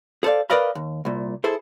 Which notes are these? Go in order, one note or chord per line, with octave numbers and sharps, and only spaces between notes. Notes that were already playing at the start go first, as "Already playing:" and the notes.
G#4 A4 C5 D5 F5
A#4 B4 D5 D#5 F5 B5
D#2
C2 A#2
E4 G#4 A4 C5